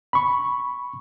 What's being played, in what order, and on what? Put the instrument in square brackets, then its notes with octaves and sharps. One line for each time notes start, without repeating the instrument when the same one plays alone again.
[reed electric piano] B5 C#6